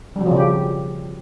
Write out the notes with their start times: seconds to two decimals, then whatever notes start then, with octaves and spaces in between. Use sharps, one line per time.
0.16 G3
0.21 F#3
0.26 F3
0.31 C#3
0.36 G4